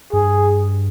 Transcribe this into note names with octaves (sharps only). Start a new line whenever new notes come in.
G2 G#4